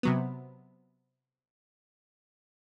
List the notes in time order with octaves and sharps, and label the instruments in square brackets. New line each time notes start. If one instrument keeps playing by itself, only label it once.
[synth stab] C3 F#3 B3